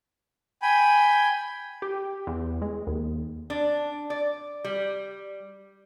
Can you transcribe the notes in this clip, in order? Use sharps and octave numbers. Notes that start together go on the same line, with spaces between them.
G5 G#5 B5
G4
E2
G#3
D#2
D4
D5
G3